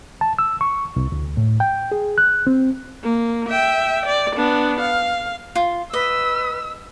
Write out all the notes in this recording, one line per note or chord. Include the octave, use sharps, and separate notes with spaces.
A5
E6
C#6
C2
D2
A2
G5
G#4
F#6
C4
A#3
E5 G5
D5
B3 D4
F5
F4
B4 D#5 E6